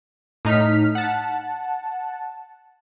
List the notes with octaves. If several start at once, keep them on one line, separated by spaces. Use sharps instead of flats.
A2 D#4 F6 B6
F#5 A5